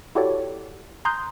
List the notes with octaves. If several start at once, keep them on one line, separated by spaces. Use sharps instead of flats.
E4 F#4 G4 A4 C#5 D5
G#5 A#5 C6 D#6 F#6 G6